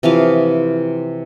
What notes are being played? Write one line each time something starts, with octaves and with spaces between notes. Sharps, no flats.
C3 E3 F3 F5